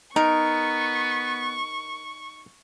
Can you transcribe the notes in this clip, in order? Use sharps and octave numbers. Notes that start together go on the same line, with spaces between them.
B3 D#4 A#4 C#6